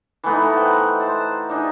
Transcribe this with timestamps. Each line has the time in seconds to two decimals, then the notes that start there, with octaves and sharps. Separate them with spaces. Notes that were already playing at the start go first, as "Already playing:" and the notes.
0.24 E3 A3 B3 D#4
0.56 C5 F#5 G5
1.00 C5 A5
1.49 D4 D#4 G#4